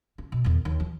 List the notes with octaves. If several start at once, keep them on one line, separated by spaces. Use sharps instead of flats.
C#4
B2
E2 D#3
D#2
E3